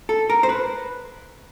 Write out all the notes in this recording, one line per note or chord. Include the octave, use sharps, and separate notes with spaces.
A4
A#4
C5
B4